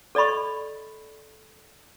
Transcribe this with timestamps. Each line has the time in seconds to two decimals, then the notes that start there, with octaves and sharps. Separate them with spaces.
0.15 A4 D5 D#5 B5 C#6